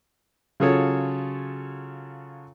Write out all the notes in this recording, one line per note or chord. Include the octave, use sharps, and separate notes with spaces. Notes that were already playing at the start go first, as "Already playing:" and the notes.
C#3 F#3 F4 G#4 A4 C#5